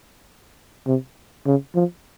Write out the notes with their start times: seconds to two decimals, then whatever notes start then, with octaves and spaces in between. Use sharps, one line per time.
0.87 C3
1.46 C#3
1.75 F3